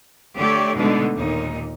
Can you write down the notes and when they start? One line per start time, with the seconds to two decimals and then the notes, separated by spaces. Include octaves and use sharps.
0.36 D3 A3 G4 C#5 D5
0.75 B2 D3 G#3 A3 D4 D#4
1.14 D#2 A#2 D#4